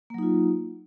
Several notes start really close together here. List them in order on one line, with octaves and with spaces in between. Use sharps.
A#3 F#3 D#4 F4